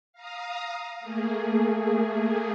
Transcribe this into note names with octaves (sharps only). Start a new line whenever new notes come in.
F5 A#5 D#6
A3 A#3 G#4